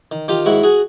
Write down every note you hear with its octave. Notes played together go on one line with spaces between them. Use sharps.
D#3
D#3 F4 G4
G#2 E4 F#4
F#4 G#4